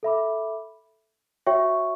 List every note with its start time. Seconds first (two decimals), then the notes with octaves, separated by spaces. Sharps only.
0.03 A4 E5 B5 D6
1.47 F#4 C#5 E5 G5 C#6